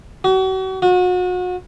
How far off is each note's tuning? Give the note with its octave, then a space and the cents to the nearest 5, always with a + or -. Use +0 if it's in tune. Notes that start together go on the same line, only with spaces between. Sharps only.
F#4 +40
F#4 -35